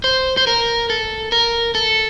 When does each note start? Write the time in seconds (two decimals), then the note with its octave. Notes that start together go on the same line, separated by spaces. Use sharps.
0.04 C5
0.37 C5
0.47 A#4
0.90 A4
1.32 A#4
1.75 A4